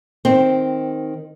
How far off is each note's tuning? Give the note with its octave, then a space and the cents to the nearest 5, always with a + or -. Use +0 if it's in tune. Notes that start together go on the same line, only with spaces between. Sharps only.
D#3 +0 C4 +0